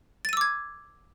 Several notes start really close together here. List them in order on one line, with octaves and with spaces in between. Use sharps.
A6 D#7 E6 D6 G#6